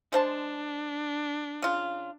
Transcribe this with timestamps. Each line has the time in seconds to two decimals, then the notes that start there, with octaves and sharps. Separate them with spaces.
0.12 G#3 D4 C5 A5
1.62 C#3 F4